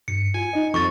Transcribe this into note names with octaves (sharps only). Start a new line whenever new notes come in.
G2 C#7
F4 G#5
D#4 D#5
F2 C#6 A6